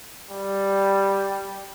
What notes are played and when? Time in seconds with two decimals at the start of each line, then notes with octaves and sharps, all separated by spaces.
0.31 G3